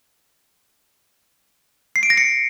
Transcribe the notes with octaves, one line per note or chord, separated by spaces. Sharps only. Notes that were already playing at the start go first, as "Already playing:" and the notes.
C7
D7
A#6
C#7